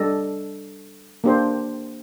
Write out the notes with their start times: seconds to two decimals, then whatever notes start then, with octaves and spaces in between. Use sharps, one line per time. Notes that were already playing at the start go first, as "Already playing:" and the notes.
Already playing: G3 D4 A4 D#5
1.24 A#3 D4 G4 C5